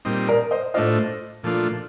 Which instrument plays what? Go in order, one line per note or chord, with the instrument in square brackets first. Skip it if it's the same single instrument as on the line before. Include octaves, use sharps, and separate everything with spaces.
[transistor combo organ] A#2 G3 C4 D#4
[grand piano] A#4 D5
C5 D#5
[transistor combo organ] A2 A3 D4 F4 [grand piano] C5 D#5
[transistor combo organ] A#2 F3 A3 D4 F4